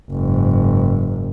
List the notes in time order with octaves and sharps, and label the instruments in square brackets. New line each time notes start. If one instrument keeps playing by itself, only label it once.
[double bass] F#1 G#2